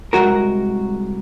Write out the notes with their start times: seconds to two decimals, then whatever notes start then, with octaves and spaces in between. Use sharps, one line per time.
0.13 C2 F2 G#3 F#4 A#4